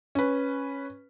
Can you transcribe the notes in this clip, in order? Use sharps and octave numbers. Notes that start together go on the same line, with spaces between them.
C#4 B4